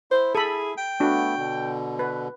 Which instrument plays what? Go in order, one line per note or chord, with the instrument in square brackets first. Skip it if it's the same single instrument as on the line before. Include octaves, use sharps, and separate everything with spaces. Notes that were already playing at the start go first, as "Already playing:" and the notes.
[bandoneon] E4 [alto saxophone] C5
[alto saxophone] G#4 [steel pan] A4 B5
[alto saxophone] G5
[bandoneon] A3 B3 [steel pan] D4 F#4
[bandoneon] B2 D3
[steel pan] B4